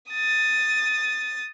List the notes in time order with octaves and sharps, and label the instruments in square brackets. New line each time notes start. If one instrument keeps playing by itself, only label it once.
[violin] D#6 A6